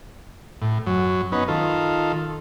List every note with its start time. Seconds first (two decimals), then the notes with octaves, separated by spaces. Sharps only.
0.62 A2
0.87 F#2 F#3
1.32 B3 C#4 D#4 B4
1.48 D#3 F4 A4